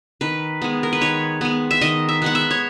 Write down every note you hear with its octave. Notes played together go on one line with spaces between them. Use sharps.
D#3 B4
G#3 B3
A#4
B4
D#3 C#5
G#3 B3
E5
D#3 D#5
E5
G#3 B3 F#5
E5
C#5